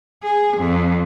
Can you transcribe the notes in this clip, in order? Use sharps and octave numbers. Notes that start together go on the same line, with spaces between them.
G#4
F2